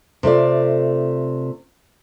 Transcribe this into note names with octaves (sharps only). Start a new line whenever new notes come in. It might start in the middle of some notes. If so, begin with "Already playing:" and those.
C3 A3 F4 D5